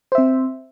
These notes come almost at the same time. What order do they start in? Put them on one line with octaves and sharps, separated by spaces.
C5 E5 C4